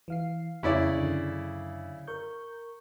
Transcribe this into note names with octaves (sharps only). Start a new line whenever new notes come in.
E3 F5 C7
F2 C#3 E4 D5
F#2 D3
A#4 C#6 G6